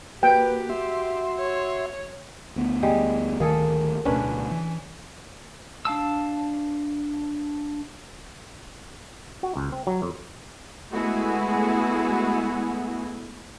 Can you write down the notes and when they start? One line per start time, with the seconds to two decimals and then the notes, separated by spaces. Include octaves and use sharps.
0.23 A#3 F#4 G4 B4 G5
0.69 F#4 E5 C6
1.38 C#5
2.56 D2 B3
2.83 G3 G#3 G4
3.40 D1 D2 D#3 A#3 G#4 A4
4.05 D1 D2 B2 C#4 D4 B4
4.51 E3
5.85 D4 F5 A5 E6
9.43 F#4
9.56 C#2
9.72 C4
9.87 F#3
10.02 F2
10.91 G#3 A3 B3 E4 F#4 G#4